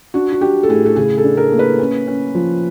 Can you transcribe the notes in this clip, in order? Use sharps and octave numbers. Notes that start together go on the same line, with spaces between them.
D4 F#4
F#4
D4 G4
A4
A2 G#4
A4
C#3 G#4
A4
D4
A#4
A#3
B4
C#4
C#4
F3